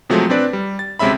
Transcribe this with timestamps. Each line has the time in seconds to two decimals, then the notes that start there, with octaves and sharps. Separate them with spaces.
0.10 C3 F3 F#3 G#3 A3
0.30 C4 D4 B4 D5
0.53 G3
0.79 A6
0.99 D2 C3 G#3 C#4 E5 B5